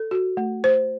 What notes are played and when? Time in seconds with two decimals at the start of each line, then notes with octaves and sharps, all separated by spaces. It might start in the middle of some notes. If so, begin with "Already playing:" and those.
Already playing: A4
0.11 F#4
0.37 A3
0.64 C5